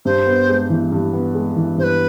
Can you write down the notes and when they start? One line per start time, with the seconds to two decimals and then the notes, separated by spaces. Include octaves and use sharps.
0.05 G2 C5
0.27 B3
0.49 G#3
0.70 E3
0.92 G2
1.13 B3
1.35 G#3
1.56 E3
1.78 G2 C5
1.84 B4